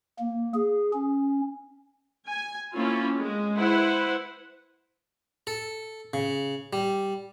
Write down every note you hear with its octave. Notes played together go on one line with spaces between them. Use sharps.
A#3
G#4
C#4
G#5
A#3 C4 C#4 E4 F4
G#3
E4 B4 C5 F#5
A4
C#3
G3